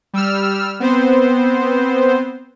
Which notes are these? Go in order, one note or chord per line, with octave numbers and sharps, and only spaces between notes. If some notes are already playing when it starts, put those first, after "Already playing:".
G3 E6 F6
B3 C4 C5